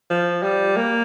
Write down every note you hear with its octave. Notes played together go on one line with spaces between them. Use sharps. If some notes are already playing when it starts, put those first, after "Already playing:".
F3
G3
A#3